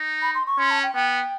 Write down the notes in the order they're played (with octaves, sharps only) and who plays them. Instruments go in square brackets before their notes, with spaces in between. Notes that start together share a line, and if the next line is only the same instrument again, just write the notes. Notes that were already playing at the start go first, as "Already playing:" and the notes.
Already playing: [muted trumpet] D#4
[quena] B5
C6
C#6
[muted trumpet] C#4 [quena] C6
[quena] A5
G5
[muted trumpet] B3 [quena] G5